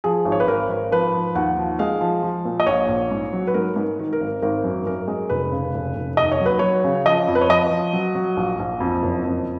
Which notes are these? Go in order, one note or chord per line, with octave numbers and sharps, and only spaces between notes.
F3 G#4
G#1
C#5
B4
G#1 A#4
G#1
F3 B4
F3
D#2 F#5
F3
G#3 F5
F3
F3
A#2
D#5
A#1 C#5
A#1
G#2
F#3
B4
G#2 A#4
G#2
D#3
A#4
G#1
G#1 A#4
F#2
F#2 A#4
G#3
F1 B4
C#3
F1
F1
D#2 D#5
C#5
F#3
B4
F#3 C#5
C#3
F3 D#5
F2
B4
C#5
F3 D#5
F3
F#3
F#3
A#1
A#1
F2
F#1
F2